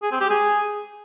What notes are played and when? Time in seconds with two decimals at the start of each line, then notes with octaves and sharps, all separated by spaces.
0.03 G#4
0.12 C4
0.21 G4
0.30 G#4